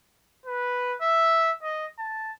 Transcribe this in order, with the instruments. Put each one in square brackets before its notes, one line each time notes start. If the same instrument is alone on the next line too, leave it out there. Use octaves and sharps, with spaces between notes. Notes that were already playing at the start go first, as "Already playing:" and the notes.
[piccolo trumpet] B4
E5
D#5
A5